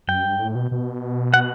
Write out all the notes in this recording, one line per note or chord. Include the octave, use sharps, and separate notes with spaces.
F#2 G5
G2
A2
B2
B2
F#5